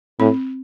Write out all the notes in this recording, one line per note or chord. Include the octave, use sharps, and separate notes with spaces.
A2 C4